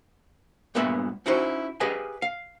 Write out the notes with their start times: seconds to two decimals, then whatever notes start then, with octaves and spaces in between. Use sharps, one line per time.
0.75 G2 A#2 G#3 B3 E5 B5
1.26 C#4 D#4 E4 F#4 C5
1.80 G4 G#4 B4 D#5 F5 G#5
2.22 F5